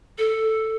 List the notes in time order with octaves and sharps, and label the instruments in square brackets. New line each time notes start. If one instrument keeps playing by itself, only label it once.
[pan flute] A4